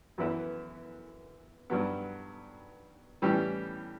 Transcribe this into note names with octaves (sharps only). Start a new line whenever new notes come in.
F#2 E3 B3 E4 B4
G2 F#3 B3
A2 E3 G3 C#4 G4